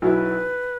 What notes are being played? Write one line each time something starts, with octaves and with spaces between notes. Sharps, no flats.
B1 B2 F#3 E4 B4